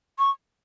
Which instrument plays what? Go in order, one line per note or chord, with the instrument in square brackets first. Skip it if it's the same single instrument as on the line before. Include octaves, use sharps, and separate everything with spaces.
[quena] C#6